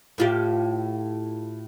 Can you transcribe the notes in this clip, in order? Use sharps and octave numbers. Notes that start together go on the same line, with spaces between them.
A2 F4 G4